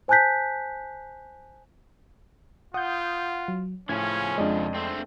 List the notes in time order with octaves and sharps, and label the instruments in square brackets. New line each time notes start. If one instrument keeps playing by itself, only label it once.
[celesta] C5 G#5 A5 F#6 G6 B6
[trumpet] F4 [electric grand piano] F#5 [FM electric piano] D#6 G6
[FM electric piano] F#3
[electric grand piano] A2 [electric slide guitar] C#3 F3 [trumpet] C#4 [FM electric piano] G#6
[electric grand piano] F2 D5 D#5 [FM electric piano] G#3 D4
[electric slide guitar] A3 C4 [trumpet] C5